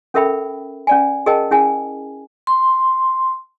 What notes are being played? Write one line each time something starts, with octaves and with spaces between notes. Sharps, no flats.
C#4 A4 A#4 E5 G5 B5
C#4 D5 G#5
G#4 A#4 D#5 G5 A5
C#4 E4 G#4 G#5
C6